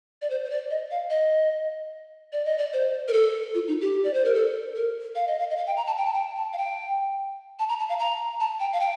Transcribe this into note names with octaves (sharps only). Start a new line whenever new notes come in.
D5
C5
C5
D5
D#5
F5
D#5
D5
D#5
D5
C5
A#4
A4
F4
D#4
G4
D5
C5
A#4
A4
A#4
F5
D#5
F5
D#5
F5
G5
A#5
A5
G5
A5
G5
A5
F5
G5
A5
A#5
A5
F5
A#5
A5
G5
F5
G5